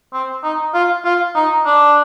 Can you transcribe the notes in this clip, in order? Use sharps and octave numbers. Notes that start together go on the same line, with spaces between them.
C4
D#4
F4
F4
D#4
D4